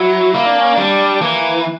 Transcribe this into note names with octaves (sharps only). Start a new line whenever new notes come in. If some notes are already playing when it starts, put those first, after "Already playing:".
Already playing: F#3 E4
A#3 E4
D4
C#4
G3 D4
E3 A#3